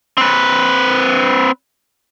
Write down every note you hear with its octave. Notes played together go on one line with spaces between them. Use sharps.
C4 B4